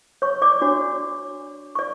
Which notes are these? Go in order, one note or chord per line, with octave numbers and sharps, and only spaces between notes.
C#5 C#6
D5 D6
D4 F#4 C#5
C#6
D5